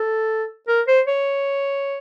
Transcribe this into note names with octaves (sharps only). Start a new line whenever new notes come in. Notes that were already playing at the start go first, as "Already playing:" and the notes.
Already playing: A4
A#4
C5
C#5